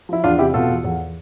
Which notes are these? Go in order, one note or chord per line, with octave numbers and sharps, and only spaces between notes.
F3 E4
E2 D4 F4
C3 E4 G4
B2 F4 A4
E2
E2